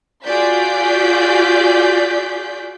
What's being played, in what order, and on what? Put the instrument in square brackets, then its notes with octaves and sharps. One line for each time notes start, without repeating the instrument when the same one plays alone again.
[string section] F4 F#4 G#4 D5 G6 B6